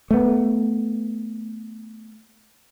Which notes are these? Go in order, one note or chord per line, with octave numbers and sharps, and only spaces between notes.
A3 B3